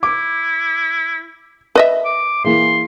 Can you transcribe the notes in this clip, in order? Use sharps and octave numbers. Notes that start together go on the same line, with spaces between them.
E4 D6
B4 D#5 E5
D6
E3 A#3 G#4 C6